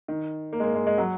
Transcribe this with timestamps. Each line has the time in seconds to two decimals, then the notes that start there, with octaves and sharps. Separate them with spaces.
0.08 D#3
0.53 A#3
0.60 G#3
0.64 A#3
0.75 G#3
0.87 G#3
0.98 F#3